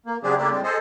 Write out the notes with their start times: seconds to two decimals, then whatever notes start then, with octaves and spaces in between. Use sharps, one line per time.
0.06 A#3
0.23 C#3 F#3 C4 D4 G4 G#4
0.38 C#3 A3 A#3 D4 E4 G4
0.51 A2 G3 G#3 C4
0.64 G#4 A4 C5 D#5